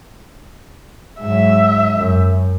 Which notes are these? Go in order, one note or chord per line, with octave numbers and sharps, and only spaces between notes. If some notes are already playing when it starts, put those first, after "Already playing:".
G#2 F#3 E5
F#2